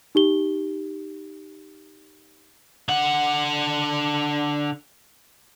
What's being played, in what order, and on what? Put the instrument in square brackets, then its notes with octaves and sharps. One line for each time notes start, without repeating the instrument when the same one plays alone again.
[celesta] D#4 G4 G7
[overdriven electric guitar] D3 F#5